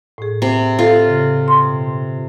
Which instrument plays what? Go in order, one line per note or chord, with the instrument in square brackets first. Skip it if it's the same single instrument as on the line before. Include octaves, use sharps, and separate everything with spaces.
[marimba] A2 G#4
[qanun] C3
[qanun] F4 [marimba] A4
[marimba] C#3
C6
B2